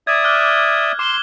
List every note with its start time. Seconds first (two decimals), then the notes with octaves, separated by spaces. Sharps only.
0.07 D5 E5 D#6 G#6
0.24 D6 F6 F#6
0.99 C6 D6 E7 G7